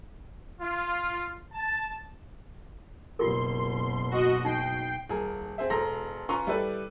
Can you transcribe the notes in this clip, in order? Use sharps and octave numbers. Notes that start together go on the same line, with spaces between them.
F4
A5
F#1 B2 F4 G4 A#4 C6
F#4 D#5
D#4 G5 C7
D#1 G#4 A#4
C4 G#4 C5 E5
E1 A4 A#5 C6 A#6
C#4 F4 B4 A#5 C6 C#6
G3 E4 G4 A4 B4 D5